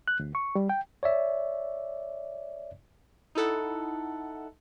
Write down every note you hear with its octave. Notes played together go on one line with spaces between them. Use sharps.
F#6
D2
C#6
G3
G5
C#5 D5 E5
D#4 E4 A4 F#5